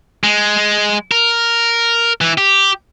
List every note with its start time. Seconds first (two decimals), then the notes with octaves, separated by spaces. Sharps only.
0.24 G#3
1.12 A#4
2.21 E3
2.38 G4